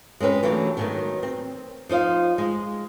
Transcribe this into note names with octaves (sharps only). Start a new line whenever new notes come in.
G#3 C4 C#4 B4
E3 F#3 A3 A#3 D4 G4
D#3 F#3 G#3 A3 B3
C4
F3 D#4 C5 F5
G#3